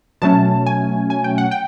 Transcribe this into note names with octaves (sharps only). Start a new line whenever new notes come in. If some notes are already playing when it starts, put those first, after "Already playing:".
B2 F#3 A3 C#4 A5
G#5
G#5
G5
F#5
G5